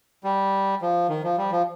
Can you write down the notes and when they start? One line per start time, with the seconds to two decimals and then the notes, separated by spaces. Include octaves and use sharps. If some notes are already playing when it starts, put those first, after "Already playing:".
0.24 G3
0.82 F3
1.09 D#3
1.23 F3
1.38 G3
1.52 F3